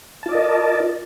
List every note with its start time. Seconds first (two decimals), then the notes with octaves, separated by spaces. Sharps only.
0.23 A5
0.26 F4
0.29 D5
0.32 D#5
0.35 A#4